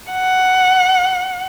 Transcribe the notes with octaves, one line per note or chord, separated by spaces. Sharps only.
F#5